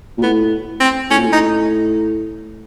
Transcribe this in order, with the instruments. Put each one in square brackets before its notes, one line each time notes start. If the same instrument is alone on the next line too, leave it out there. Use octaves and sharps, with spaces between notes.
[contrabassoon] A#2
[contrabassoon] A2 [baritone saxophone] B3
[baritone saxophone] C4
[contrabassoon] A2 [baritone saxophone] C#4
[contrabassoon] A#2
A2
[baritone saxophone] D#4